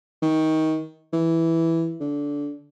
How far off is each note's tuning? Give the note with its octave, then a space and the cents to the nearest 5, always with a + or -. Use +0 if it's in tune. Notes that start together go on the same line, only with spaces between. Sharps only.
D#3 +20
E3 +0
D3 -20